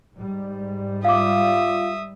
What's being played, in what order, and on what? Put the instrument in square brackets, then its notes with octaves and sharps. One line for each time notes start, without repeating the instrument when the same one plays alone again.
[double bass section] G#2 G3
[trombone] F4 [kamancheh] E5 D#6 [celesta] F5 D6